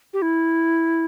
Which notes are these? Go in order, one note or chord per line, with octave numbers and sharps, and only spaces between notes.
G4
E4